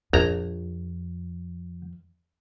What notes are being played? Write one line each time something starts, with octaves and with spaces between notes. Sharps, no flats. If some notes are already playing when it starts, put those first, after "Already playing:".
A#1 F2 A#5